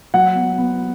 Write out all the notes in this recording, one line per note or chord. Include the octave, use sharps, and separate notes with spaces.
F#3 F#5
B3
B3